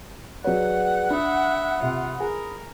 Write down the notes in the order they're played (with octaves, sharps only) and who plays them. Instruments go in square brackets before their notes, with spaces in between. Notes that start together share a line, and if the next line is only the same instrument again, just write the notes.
[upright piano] F#3 C#5 [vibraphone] G#4 B4 D5 [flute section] F#5 F#6
[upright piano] D4 [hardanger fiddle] E5 [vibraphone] B5 D#6
[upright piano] C3 [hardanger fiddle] F4
[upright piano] G#4 [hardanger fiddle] A#4